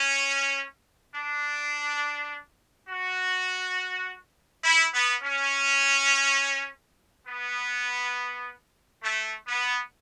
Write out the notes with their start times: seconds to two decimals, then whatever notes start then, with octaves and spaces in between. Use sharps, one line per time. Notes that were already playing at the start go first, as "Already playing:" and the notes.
Already playing: C#4
1.14 D4
2.89 F#4
4.63 E4
4.93 B3
5.22 C#4
7.27 B3
9.02 A3
9.46 B3